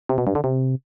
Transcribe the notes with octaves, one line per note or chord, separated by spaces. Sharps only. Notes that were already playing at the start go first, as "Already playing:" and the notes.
C3
B2
G2
D3
C3